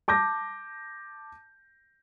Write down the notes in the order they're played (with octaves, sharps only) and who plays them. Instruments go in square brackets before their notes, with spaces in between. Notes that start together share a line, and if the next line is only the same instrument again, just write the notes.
[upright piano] A5 D6 G6 A#6